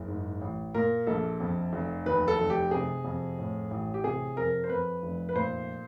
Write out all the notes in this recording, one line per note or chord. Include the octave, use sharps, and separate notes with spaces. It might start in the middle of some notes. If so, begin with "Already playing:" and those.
Already playing: F#1
G#2
A1
A#2 A#4
A#1 A4
F2
F1
D#2 B4
A4
F1
G4
C3 G#4
F2
A2
A1
G4
C3 G#4
F2 A#4
C5
F2 B4
F1
B4
A#2 C5